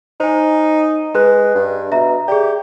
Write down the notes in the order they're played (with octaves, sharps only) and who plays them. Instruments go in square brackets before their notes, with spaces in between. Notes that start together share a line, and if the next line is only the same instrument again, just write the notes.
[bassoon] D#4 [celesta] C5 G#5
[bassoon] G#3 [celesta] B4 F#6
[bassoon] G2
[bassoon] B2 [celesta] E5 A#5
[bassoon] G4 [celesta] G#4 D5